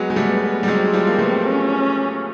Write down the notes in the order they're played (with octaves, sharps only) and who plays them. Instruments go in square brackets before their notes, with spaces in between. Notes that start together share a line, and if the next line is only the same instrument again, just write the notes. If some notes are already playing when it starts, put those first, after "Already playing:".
Already playing: [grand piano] F#3 G#3 [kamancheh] B3
[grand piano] G#3
G3 A3
G3
[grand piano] F#3 G#3 [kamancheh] C4
[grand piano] F3 G3
A#3
A3 B3
[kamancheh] C#4